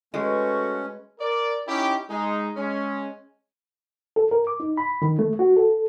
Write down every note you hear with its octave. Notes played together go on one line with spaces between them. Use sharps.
G#3 A3 C#4 F#4 B4
A#4 D5
C#4 D#4 E4 G4
G#3 D#4
G#3 C#4
A4
A#4
D6
D#4
B5
D#3
A3
F#4
A4